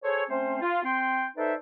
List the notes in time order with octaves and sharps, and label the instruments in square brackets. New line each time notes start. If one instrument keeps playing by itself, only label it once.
[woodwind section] G#4 A4 C5 C#5
A3 C4 C#4 C5
F4
C4 G5 C6
D#4 A4 B4 C5 D5 E5